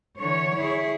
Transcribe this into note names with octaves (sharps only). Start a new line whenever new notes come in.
D3 E3 C#5
E4 G#4